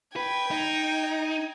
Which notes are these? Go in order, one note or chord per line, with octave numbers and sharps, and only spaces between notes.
B4 G5 G#6
D#4